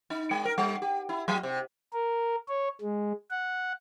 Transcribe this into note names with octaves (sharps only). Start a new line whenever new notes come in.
D#4
G#3
A#4
G3
G4
E4
F#3
C3
A#4
C#5
G#3
F#5